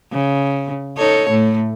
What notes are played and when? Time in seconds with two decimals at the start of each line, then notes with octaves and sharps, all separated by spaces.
0.12 C#3
0.98 D#4 A4 C#5
1.29 A2 A3